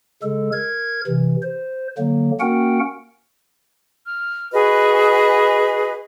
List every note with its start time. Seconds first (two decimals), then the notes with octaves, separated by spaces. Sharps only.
0.23 C#3 G#3 A4
0.52 A#4 G#6
1.06 C3 E3
1.42 C5
1.98 D3 F#3 A#3
2.40 A#3 C#4 F#4 A#4 F#5 G5
4.05 F6
4.52 F#4 G#4 B4 D#5